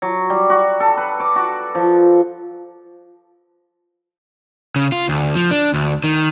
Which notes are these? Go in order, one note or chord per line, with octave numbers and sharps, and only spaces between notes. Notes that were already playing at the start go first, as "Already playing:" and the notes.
F#3
G3
F#4
A4
B4
D6
F#4
F3
C#3
F4
D2
F3
D4
D2
D#3